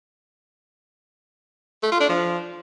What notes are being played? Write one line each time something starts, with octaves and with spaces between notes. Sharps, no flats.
A3
F4
D4
F3